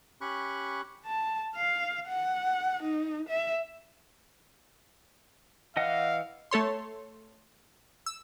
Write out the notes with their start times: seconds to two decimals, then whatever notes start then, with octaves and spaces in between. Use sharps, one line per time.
0.21 C#4 G4 B5 C#6 F#6
1.06 A5
1.55 F5
2.08 F#5
2.83 D#4
3.29 E5
5.77 E3 D#5 F5 F#5
6.51 A3 A4 C#5 C6
8.06 E6